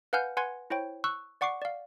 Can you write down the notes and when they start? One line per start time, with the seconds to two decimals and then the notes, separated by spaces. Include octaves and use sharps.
0.13 B4 F5 F#5 G#5 F6 G6
0.37 B4 F#5 G#5 C6 G#6
0.70 E4 C5 C#5 G5
1.04 C#6 E6 F#6
1.41 D5 F#5 C#6 D6 C7
1.62 D5 F5